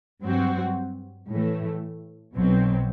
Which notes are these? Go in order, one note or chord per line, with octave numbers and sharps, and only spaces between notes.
G2 F#3 C4 F#4
A2 E3 A3
B1 B2 F#3 C4